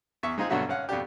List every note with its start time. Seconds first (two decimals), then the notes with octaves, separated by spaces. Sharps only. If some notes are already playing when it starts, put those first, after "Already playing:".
0.23 E2 E5 C#6
0.38 G#3 C4 D#4 F4 G#4
0.49 G2 B2 D3 F#3 F#4 E5
0.68 G#1 C#4 F5 F#5
0.89 F2 B2 D4 G4